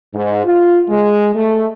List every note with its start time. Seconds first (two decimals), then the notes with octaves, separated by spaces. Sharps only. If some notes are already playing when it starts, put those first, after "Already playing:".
0.14 G#2
0.45 F4
0.89 G#3
1.35 A3